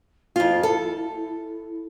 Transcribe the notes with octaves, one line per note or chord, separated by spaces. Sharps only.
F2 E4 F4
A4